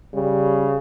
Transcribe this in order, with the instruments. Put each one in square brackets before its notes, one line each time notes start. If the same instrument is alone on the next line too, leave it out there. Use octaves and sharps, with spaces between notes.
[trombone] C#3 [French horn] G3